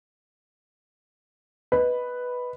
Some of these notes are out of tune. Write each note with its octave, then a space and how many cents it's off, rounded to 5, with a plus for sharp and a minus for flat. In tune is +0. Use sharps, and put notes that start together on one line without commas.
B4 +0 D#5 +0